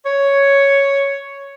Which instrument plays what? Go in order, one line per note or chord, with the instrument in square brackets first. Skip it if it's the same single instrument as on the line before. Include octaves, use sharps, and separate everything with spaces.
[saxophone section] C#5